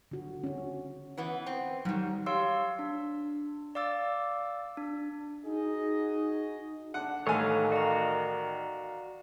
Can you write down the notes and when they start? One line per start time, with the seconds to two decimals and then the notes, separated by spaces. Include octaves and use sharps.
0.11 D3 F#4
0.43 C#4 F#4
1.17 E3 B3
1.46 C4
1.85 G#2 D#3 F#3 G3
2.26 G4 C#5 F5 C6 E6
2.79 D4
3.75 D5 F5 D6 E6 A6
4.77 D4
5.45 D#4 F#4 G#4 D#5
6.94 D3 D4 F#5
7.27 A1 D#3 A4 C#5 F5 G#5
7.72 F#4 D5 F5 A#5